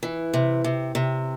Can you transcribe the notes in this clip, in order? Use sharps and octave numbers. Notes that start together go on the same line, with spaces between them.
E3
C3
C3
C3